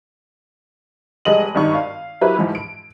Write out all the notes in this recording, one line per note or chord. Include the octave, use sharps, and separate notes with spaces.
F1 G3 G#3 D#5 D#7 F#7
G#1 G2 D#3 D#4 C#6
F5
F#3 E4 G4 A#4 B4
G#2 E3 F3
D7